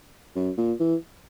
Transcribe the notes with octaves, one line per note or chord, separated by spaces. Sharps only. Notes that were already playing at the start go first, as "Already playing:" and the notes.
F#2
A#2
E3